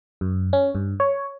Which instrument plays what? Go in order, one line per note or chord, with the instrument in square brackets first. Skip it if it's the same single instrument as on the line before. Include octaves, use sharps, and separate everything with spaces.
[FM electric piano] F#2
C#4
G2
C#5